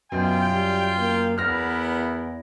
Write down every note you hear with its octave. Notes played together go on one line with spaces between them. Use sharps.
F#2 B2 F4 G5
G3
A#3
E2 B3 E4 A#4 F6 A#6